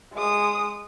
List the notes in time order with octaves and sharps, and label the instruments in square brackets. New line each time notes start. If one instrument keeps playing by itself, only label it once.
[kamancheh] G#3 D#6